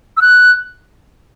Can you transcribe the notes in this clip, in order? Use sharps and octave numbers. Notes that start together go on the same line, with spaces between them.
E6
F#6